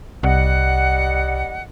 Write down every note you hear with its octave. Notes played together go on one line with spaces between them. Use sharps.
C2 G3 D#5 F#5